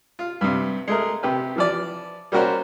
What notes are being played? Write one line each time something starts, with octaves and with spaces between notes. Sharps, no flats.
F4
G2 C3
G#3 A3 A#4
C3 G4 B4
E3 F3 D5
G3 A#3 C#4 F#4 A#4 C5